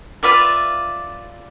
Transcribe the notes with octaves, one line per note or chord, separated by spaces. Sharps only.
F4 B4 D5 E5